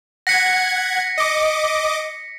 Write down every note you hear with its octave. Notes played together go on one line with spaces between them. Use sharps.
F#5 G#6 A#6 B6 C#7
D#5 D6